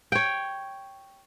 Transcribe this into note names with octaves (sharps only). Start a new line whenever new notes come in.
C#5 G5